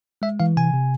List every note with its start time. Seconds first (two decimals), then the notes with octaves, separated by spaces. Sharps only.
0.22 G#3 E5
0.40 E3 F5
0.57 C3 G#5
0.74 C3